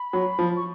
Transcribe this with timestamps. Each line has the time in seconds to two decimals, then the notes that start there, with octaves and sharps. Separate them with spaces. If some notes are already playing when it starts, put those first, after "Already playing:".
Already playing: B5
0.13 F#3
0.39 F3
0.56 C#6